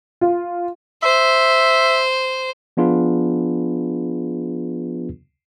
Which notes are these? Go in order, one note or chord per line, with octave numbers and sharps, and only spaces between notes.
F4
C5 E5
F3 B3 D4 F4 G#4 B4